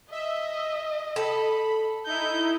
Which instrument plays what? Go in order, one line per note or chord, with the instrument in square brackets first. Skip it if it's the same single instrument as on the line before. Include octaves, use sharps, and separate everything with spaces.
[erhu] D#5 [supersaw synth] E5
[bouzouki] A4 [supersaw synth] B5
[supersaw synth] D#4 E4 [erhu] G6